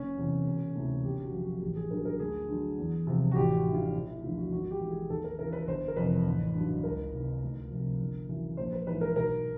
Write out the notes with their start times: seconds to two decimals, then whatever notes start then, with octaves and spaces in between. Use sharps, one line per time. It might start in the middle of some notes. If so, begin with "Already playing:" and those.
Already playing: F#1 C#4
0.17 E2 C3
0.46 E1
0.75 D2 C3 E3
1.04 G1 G4
1.23 F#4
1.32 F#2 C#3 F3
1.43 F#4
1.62 A1 G4
1.76 G#4
1.90 G2 D3 F#3 A#4
2.05 A#4
2.19 D2 G#4
2.48 D3 F#3
2.78 E2
3.07 C3 F3
3.31 F#4
3.36 A1 G4
3.55 F#4
3.65 G2 E3
3.74 F4
3.93 E1
4.08 E4
4.22 D2 D3 F3 F4
4.37 F#4
4.52 G#1 F#4
4.71 G4
4.81 G#2 E3
4.91 G#4
5.10 D#2 A4
5.24 A#4
5.39 C#3 E3 A#4
5.53 B4
5.67 G1 C5
5.88 A#4
5.96 F2 C3 E3 B4
6.26 A1
6.54 G2 D#3 F#3
6.83 C#2 A#4
7.13 C3 D#3
7.42 D2
7.71 C3 F3
8.00 G1
8.29 F#2 C#3 E3
8.57 A#1 C5
8.72 B4
8.87 G#2 E3 B4
9.01 A#4
9.16 B1 A#4